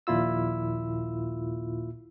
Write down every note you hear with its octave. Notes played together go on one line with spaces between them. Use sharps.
A#1 D#2 A#2 E4 F4 E6